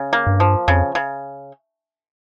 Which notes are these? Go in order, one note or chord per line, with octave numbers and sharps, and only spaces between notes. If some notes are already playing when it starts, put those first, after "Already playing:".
Already playing: C#3
A#3
G2
F3
F2 C#3
C#3